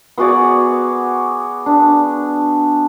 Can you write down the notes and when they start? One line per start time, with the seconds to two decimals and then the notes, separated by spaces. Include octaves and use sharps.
0.18 B3 F#4 G#4 D5
1.66 D4